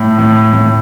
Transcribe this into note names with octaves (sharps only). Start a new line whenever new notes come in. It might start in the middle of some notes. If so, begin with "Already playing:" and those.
Already playing: A2
A2
A2